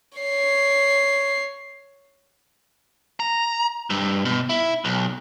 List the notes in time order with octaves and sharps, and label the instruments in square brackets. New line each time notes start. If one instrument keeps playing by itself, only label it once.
[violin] C#5 C7
[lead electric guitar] A#5
G2
B2
E4
B1